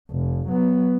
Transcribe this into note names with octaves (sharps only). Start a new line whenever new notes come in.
F1
F#3 B3